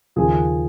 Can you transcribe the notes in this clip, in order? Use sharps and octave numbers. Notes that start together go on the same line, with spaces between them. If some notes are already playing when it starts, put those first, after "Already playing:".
D#2 C#3 F3 G#4